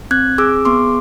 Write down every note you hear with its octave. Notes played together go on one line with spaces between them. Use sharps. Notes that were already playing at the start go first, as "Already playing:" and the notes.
C4 F#6 G#6
G#4 D6 E6
B3 C6 D6